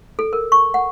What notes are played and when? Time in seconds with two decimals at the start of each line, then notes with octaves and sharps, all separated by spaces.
0.19 A4
0.33 A#4
0.52 C#6
0.74 F#5